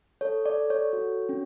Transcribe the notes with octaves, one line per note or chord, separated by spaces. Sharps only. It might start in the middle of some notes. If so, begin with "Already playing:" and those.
A4 C#5
D5
A4
C#5
F#4
C#4